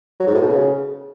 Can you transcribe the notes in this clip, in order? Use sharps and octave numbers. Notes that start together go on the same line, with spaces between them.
F#3
G#2
A2
B2
C#3